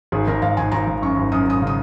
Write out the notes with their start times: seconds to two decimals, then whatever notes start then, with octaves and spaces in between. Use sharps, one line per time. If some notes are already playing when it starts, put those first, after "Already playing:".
0.12 G#1 G#4
0.28 G#1 A#4
0.42 G#1 F5
0.57 G#1 G#5
0.72 G#1 A#5
0.87 G#1
1.02 F#2 C#6
1.17 G#1
1.32 F#2 D#6
1.46 F#2 D#6
1.62 C#3
1.67 D#6